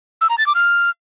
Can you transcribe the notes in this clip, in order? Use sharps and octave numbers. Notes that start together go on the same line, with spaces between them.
E6
A#5
A6
D6
F6